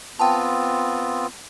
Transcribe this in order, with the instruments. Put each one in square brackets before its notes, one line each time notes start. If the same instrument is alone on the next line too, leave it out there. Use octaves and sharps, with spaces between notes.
[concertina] B3 C4 F4 [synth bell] G5 A5